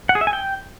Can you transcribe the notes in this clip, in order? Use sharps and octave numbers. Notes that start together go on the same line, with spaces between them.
F#5
G#4
E5
G#5
G5